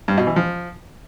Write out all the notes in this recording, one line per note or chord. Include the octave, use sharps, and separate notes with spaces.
G2
B2
E3
F3